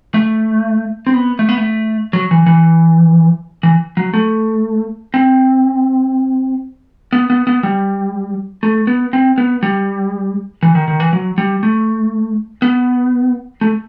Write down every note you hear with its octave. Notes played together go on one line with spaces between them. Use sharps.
A3
C4
B3
A3
B3
A3
F#3
E3
E3
E3
F#3
A3
C4
B3
B3
B3
G3
A3
B3
C4
B3
G3
E3
D#3
D#3
E3
F#3
G3
A3
B3
A3